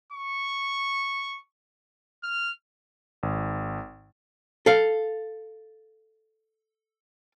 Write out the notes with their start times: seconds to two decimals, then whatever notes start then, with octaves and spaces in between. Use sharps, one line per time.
0.13 C#6
2.23 F6
3.23 G#1
4.66 A4 F5